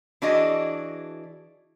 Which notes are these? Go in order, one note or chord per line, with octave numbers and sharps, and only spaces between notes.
E3 D4 F#4 G#4 D#5